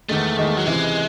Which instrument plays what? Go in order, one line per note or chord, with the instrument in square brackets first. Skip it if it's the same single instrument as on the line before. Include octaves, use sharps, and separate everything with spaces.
[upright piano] E2 D#3 G#3 [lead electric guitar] A3
[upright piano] E2 D#3 G#3
[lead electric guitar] F#3
[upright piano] C#2 C3 E3 [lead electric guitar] G#3